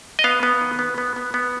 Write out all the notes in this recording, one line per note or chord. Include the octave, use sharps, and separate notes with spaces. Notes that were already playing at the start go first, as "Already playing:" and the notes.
D#5
B3 F5
B3
D#3
B3
B3
B3
B3